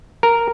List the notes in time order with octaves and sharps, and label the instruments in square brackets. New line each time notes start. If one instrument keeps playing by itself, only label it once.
[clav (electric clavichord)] A#4